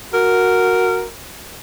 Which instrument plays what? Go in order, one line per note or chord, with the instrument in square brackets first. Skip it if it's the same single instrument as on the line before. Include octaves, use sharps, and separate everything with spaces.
[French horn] F#4 [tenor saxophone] A#4